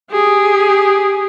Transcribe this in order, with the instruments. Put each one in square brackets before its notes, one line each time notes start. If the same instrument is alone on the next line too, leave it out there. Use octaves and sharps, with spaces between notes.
[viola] G4 G#4